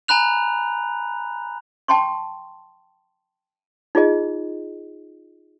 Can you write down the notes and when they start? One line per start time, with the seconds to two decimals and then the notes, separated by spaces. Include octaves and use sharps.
0.08 G#5 A#5 B5 F#6 F7
1.88 G5 A5 C6 C#6
3.95 D#4 F4 G#4 D#5